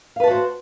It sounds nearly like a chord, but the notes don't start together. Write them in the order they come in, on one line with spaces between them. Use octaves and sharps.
F5 B4 A5 F#4 C5